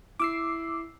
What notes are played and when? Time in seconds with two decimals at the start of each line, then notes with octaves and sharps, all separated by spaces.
0.20 E4 D6 E6 C7